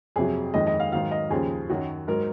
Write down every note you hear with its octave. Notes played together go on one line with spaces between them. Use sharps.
F2 C3 F#3 G#4
F2 D#3 G#3 D#5
D#5
F5
G#2 D#3 F#3 F5
D#5
D#2 C#3 F3 G#4
F#2 D#3 F#3 F#4
G#2 F#3 A#4